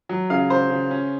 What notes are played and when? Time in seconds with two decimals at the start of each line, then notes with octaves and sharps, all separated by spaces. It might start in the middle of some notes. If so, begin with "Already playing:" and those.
0.09 F#3
0.30 C#3 F5
0.50 C#3 C5
0.70 C#3
0.91 C#4